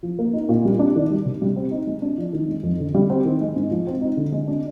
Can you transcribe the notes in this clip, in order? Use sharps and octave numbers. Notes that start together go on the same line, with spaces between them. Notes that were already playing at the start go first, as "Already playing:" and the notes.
F3
A#3
D#4
A#2
G3
D4
D#3
G3
C3
G3
C4
D#4
G#3
D4
F3
D#3
G#3
F2
D3
G3
C4
D#3
G#3
G#2
F3
C4
D#4
D3
G#3
D4